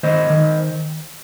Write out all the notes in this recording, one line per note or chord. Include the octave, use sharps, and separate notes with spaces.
D#3 C5 D#5
D#3